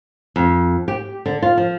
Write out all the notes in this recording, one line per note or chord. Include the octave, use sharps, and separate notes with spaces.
F2
G4
D3
F4
F3